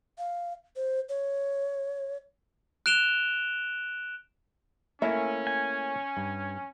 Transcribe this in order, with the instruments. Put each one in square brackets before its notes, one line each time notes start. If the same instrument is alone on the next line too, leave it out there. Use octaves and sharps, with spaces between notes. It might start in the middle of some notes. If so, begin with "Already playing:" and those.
[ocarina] F5
C5
C#5
[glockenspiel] F#6 D7 E7 F7 G7
[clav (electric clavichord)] A3 A#3 E4 [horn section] C#4 [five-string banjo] E5
[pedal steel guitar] G#5
[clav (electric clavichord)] G2